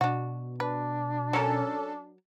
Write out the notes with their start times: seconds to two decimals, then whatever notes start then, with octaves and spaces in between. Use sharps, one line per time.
0.01 B2 D4 F#4
0.60 D4 B4
1.33 F#3 C#4 A4 A#4 A5